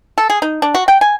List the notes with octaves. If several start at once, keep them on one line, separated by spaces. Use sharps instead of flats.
A4
G#4
D#4
D4
F#4
G5
G#5